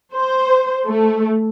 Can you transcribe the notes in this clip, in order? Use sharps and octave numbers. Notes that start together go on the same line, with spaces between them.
C5
A3